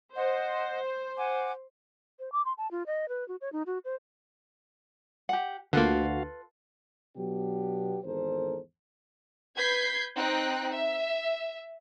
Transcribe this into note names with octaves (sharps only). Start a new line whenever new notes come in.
C5 D#5 F#5
F#5 G#5 D6
C5
D6
C6
A5
F4
D#5
B4
F#4
C#5
D#4
F#4
C5
G4 F#5
D2 D3 A#3 F4 F#4 A4 B4 F5
B2 F#3 B3 D4 G4
G#1 E2 A4 A#4 C5
B4 G6 G#6 B6 C7
C4 D#4 G5 F#6
E5